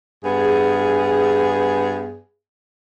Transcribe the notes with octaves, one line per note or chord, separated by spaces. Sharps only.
G2 B3 G#4